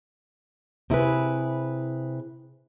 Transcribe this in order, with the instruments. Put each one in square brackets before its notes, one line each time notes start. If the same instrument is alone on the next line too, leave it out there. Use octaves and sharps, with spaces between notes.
[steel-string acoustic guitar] C3 E4 G#4 B4